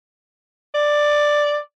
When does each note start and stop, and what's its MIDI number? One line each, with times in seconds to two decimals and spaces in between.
0.75 1.58 74